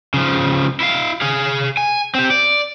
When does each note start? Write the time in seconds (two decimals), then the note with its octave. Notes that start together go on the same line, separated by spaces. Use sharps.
0.14 C#3 F3
0.80 E4 F5
1.21 G#4 F5
1.77 G#5
2.15 C4 G4
2.30 D5